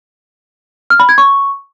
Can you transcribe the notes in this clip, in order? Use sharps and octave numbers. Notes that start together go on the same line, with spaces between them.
F6
B5
G#6
C#6